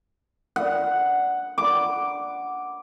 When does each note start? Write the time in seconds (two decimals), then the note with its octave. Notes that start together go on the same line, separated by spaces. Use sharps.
0.56 F#5
1.58 D6